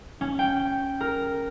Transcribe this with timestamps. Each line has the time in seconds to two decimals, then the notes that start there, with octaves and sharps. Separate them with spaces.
0.21 C#4
0.39 G5
1.00 A#4